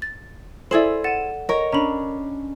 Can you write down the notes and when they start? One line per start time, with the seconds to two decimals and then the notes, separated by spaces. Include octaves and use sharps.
0.02 A6
0.71 E4 G#4 A4 C5 D5
1.04 F#5 A6 D#7 E7
1.49 A#4 C#5 D#5
1.72 C#4 D4 A#5 B5